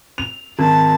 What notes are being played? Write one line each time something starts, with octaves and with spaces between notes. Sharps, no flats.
F7
G#1 A5